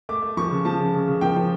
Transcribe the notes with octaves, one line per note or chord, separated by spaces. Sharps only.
A3 D6
A3
F3 C#6
C#3
F3 A5
C#3
C#3
C#3
F3 G5
F3